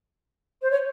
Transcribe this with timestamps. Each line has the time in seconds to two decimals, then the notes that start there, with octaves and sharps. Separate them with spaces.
0.62 C5
0.70 C#5